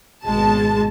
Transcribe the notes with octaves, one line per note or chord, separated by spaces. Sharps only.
G#1 B2 G#3 A5